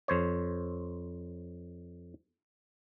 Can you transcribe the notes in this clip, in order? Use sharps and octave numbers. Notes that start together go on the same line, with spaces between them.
F2 C5 C#5